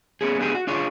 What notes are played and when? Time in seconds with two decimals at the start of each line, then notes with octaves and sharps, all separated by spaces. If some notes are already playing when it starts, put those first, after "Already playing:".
0.21 A3 B3 C#4 G#4
0.38 B3 D4 G4 G#4
0.55 F#4
0.67 D4 F4 G#4 C#5